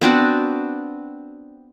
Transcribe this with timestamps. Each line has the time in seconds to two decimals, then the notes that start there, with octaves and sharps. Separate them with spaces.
0.01 B3 C4 D4 F#4